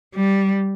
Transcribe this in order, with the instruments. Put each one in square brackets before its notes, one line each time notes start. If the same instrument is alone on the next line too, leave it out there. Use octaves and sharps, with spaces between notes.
[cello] G3